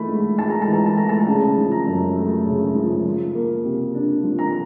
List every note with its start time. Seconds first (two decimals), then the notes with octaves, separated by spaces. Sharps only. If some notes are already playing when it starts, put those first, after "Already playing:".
Already playing: E3 A3 B5
0.09 G#2
0.38 G#2 A5
0.50 A#5
0.62 A5
0.68 E3
0.74 A#5
0.86 A5
0.98 A3 A#5
1.09 A5
1.27 C#3 A5
1.57 F3
1.72 A#5
1.87 F#2
2.16 A3
2.46 C#3
2.75 F3
3.05 F3
3.35 A#3
3.65 C3
3.95 D4
4.24 F3
4.39 A#5